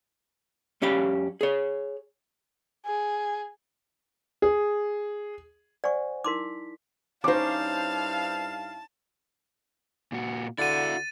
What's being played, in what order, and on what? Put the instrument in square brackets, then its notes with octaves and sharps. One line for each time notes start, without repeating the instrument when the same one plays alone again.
[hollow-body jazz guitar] F#2 C#4 G4 F5 B5
G#4 C#5
[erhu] G#4
[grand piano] G#4
[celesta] C5 F#5 G#5 [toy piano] D5 C#6
[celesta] D#4 E4 B6 [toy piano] A#4 C6 D6
[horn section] G2 E4 F5 [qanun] C#4 D#4 [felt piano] C5 D6 [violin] A5
[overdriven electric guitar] A#2 F#4
[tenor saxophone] D3 [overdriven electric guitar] E4 F#4 [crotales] A6 D#7